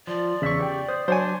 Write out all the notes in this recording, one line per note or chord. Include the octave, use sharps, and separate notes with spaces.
F3 D5
E2 C#3 E5 C#6
G4 F#5 G5
C5 D#6
F#3 D4 C5 C#5 G#5